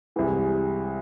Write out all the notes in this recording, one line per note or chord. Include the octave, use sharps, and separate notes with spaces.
C2 C3 E3 G#3